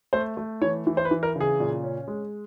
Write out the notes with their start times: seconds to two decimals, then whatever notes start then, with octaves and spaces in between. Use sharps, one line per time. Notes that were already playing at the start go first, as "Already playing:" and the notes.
0.13 A3 C5
0.37 A3
0.62 E3 C#5
0.87 E3
0.97 C5
1.05 B4
1.11 E3
1.23 A#4
1.36 C#3 G#4
1.60 A#2
1.84 C#4
2.08 G#3